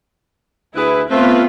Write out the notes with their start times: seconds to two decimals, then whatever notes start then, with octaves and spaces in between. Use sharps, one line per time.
0.76 D2 E4 G#4 B4
1.11 A3 B3 C4 F4 B4